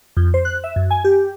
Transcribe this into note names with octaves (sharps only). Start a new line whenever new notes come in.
F2
C5
F#6
E5
F#2
G#5
G4